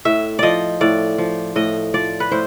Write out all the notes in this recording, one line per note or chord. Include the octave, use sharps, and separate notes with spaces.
A2 E5
F3 D5 D#5
A2 D5
F3
A2 D#5
F3 D5
B4
A2 C5